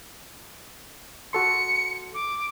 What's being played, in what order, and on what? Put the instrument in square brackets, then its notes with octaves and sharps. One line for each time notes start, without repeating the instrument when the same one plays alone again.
[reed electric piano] F#4 A4 C6 [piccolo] C#7
[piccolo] D6